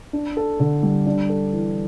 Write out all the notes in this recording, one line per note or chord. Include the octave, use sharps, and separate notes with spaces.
D4
A4
D3
G3
D4
A4
E3